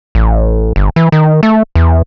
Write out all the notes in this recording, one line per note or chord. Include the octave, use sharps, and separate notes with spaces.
A1
G1
E3
D#3
A3
E2